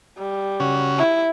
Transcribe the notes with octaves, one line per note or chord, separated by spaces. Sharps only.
G3
C#3 C#4 F#4
E4